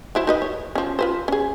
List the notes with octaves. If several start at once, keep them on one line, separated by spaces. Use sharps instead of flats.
F#3 E4 C5
D#4 B4 D#5
C#5
F3 C#4
F4 B4 C5
C#4 G#4